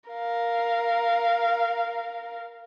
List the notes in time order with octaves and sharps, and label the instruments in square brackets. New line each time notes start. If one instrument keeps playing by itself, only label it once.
[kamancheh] A#4 F5